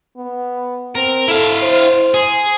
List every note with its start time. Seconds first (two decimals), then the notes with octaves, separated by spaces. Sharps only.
0.17 B3
0.95 C4 A#4
1.28 E4 A4 F5
1.62 C5
2.14 G#4